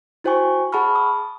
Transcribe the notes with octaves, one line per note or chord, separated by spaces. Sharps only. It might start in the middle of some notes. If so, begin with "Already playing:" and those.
E4 F#4 C5 G5 G#5 C#6
G#4 F#5 A5 B5 C#6 F6
D#6